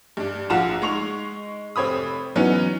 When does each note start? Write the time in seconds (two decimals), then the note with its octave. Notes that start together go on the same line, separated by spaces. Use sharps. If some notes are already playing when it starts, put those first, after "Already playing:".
0.17 G2 D4
0.50 A#1 F4 F#5 A#5 E7
0.82 G#3 D#4 C#6 F7
1.76 F1 C4 C#5 B5 D#6
2.36 E3 F#3 B3 C#4 D#4